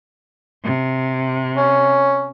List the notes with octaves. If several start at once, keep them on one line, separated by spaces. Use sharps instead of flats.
C3
C#4